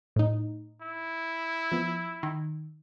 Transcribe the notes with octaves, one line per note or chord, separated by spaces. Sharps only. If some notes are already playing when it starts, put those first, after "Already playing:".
A2 D#4
E4
F3 B3
D#3